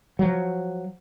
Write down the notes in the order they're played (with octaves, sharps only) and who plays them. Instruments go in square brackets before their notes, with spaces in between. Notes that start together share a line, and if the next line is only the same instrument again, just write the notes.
[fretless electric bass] F3 F#3